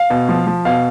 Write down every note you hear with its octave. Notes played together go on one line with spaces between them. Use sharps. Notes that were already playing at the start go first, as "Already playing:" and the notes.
Already playing: F5
B2
F3
F3
B2 F5